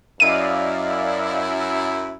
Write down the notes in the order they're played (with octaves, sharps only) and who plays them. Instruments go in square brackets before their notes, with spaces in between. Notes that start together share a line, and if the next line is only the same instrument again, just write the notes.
[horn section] F#2 E4 [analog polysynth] D5 D#5 F5 [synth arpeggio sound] D#7